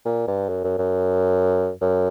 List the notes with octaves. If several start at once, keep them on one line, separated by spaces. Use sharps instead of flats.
A#2
G2
F#2
F#2
F#2
F#2